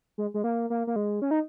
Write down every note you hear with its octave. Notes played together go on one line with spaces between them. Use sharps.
G#3
G#3
A#3
A#3
A#3
G#3
C#4
D#4